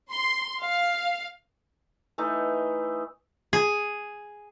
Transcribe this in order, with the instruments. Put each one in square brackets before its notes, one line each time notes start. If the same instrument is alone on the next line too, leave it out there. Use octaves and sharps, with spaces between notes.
[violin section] C6
F5
[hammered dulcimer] E3 A3 D#4
[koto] G#4